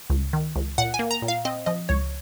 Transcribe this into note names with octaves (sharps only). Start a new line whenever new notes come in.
C#2
D#3
C#2
A#2 F#5
G#5
A#3
A#5
A#2
F5
C4 D#5
F3 D#5
C#2 C#5